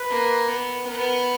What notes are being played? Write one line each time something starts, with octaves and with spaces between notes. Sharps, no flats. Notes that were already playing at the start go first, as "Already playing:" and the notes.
Already playing: B4
A#3
B3
B3 A#4